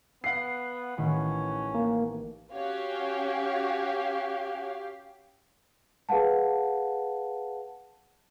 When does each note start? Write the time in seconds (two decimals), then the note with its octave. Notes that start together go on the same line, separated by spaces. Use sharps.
0.24 B3 F5 F#5 C7
0.97 A1 D#3 C#4 B5
1.74 A#3
2.53 C#4 F#4 G4 C#5 F5
6.09 G#4 B4 F5 F#5 A5